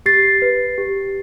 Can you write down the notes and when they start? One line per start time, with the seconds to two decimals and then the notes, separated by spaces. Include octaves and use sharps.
0.06 G4 A6 C7
0.42 B4
0.78 G4